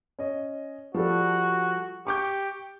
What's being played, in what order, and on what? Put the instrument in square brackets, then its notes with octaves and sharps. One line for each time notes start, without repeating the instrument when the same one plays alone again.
[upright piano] C#4 D#5
[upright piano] F3 G3 A4 [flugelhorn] F#4
[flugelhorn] G4 [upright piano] C#6 D6 G6